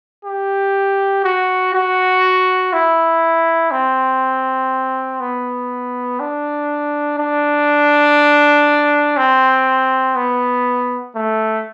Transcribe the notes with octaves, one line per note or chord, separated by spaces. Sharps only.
G4
F#4
F#4
E4
C4
B3
D4
D4
C4
B3
A3